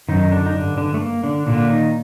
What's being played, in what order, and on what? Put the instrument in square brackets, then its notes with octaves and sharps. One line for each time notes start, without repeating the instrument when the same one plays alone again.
[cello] F#2 [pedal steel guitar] D#3 D#4
[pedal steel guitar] D3 D4
D#4
[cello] G2 [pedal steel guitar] D3 D4
[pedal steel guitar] D3 D4
A3
A#3
D3 D4
[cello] A#2 [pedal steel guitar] D3 D4
[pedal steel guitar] D#3 D#4